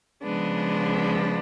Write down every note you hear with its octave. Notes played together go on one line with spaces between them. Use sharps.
C#3 F3 G#3 B3 D4